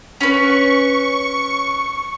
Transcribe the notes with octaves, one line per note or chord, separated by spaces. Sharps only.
C#4 B4 C#6